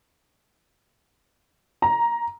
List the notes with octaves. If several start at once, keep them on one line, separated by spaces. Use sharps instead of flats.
A#5